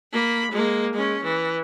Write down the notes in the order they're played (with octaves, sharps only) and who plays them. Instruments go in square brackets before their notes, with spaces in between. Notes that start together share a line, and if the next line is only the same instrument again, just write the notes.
[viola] A#3 B5
G#3 A#3
G#3 C#4
E3